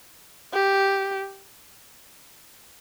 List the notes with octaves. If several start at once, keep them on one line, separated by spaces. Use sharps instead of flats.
G4